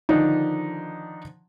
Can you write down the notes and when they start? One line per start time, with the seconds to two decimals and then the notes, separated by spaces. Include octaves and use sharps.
0.09 D3 D#3 F3 D4 D#4